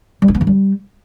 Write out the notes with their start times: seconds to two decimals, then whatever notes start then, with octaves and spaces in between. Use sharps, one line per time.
0.22 G3
0.28 D#4
0.35 B3
0.41 D#3
0.47 G3